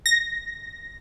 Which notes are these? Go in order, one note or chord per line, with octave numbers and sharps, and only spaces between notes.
A#6